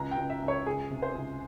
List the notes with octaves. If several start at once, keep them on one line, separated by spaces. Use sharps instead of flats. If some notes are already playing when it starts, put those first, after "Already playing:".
Already playing: C#2 A#5
G5
C#2
E5
C#2
C#5
C#2 G#4
C3
C5
C#2